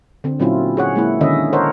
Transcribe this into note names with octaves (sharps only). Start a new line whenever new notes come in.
D3 C4
A#2 F#3 C4 C#4 E4 F4
G#4 C#5 F#5
G#3 A#3 E4
D3 D#3 C#4 D#5 E5
A4 A#4 C5 C#5 D#5 F#5